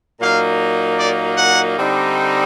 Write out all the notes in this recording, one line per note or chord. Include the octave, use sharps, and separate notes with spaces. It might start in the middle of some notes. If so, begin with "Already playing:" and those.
A#2 F#3 A#3 D#4 F5
D5
F#5
D3 G3 C4 D#4